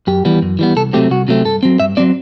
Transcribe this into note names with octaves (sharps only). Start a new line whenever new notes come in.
F#2 G4
E3 G3 B3
F#2
E3 G3 B3
C2 A4
C3 F#3 A3 C4 G4
C2 F#4
C3 F#3 A3 C4
G2 A4
F#3 C4
G2 E5
F#3 C4 D5